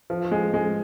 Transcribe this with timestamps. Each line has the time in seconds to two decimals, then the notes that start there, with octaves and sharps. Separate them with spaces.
0.10 F3
0.31 G#3
0.54 G#3